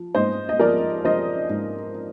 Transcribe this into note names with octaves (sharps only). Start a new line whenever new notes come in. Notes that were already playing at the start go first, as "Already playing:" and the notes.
Already playing: F3
G#2 C5 D#5
D#5
F3 A#4 D5
F3 C5 D#5
G#2